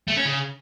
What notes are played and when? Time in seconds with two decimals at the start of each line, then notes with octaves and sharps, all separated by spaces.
0.08 A3
0.17 C#4
0.25 C#3